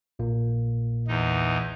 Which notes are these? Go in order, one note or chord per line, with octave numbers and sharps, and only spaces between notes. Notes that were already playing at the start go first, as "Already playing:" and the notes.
A#1 A#2 A#3
E2 D#4